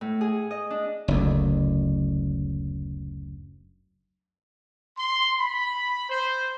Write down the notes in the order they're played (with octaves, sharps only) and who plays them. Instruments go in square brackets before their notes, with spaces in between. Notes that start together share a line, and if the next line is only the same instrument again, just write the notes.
[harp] A2
G#4
D#5
D4
[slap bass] F#1 D2
[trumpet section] C6
B5
C5